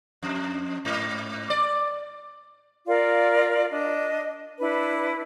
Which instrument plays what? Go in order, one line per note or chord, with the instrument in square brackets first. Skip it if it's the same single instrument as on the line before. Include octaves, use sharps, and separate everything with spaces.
[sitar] F2
G#2
D5
[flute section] F4 A#4 D5 F5
D4 D#5
D4 E4 B4